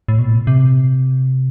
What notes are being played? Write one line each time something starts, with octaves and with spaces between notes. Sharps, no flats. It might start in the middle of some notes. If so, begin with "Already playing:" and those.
A2
B2
A#2
C3